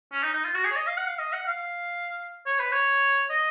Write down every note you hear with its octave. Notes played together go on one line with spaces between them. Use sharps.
C#4
D#4
D#4
F4
F#4
G#4
C#5
D#5
F5
F#5
F5
D#5
F#5
F5
C#5
B4
C#5
D#5